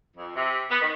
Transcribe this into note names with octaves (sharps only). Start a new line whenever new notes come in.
F2
C3
B3
D#3